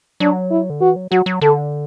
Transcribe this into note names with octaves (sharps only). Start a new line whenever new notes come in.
F#3 D4
E4
D3
E3 F#4
F#3
F#3 F#4
F#3
D3 A4